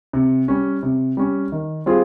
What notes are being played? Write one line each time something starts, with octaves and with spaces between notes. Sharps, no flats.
C3
G3 C#4
C3
G3 C#4
D#3
G3 C4 F4 G#4